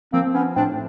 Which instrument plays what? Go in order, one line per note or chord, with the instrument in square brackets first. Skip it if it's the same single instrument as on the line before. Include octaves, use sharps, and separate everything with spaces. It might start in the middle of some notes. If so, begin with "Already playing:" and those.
[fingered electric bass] F3 [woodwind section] A#3 C4
[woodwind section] B3 C#4
[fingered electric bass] A2 [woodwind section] C4 D4